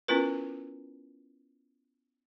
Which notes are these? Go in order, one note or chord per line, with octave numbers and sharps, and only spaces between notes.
B3 C#4 E4 F4 A#4 B4